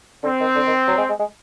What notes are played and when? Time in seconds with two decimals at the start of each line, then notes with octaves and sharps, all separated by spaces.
0.23 D3 C4
0.40 D#3
0.56 D3
0.67 D#3
0.88 F#3
0.98 G#3
1.09 G#3
1.20 G#3